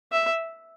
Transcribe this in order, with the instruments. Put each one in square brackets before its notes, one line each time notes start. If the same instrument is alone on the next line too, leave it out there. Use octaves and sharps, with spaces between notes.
[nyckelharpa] E5